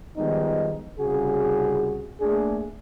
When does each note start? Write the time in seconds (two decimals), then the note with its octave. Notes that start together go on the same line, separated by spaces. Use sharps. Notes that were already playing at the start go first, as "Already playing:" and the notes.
0.17 D#3 F3 G3 G#3 B3 D#4
0.99 C2 C#3 F#4 G#4
2.20 A3 A#3 D4 G#4